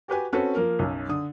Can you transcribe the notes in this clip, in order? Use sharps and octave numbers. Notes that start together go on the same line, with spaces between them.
F#4 G4 B4 G#5
C4 C#4 F#4 A4 B4
F3 A#3 A#4
B1 F#2
D3 D#6